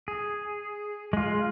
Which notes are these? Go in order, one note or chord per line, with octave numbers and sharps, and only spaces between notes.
G#4
G#3 F4